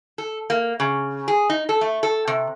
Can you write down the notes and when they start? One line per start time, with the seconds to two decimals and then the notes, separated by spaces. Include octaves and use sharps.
0.18 A4
0.50 A#3
0.80 C#3
1.28 G#4
1.50 D#4
1.69 A4
1.81 A3
2.03 A4
2.27 C3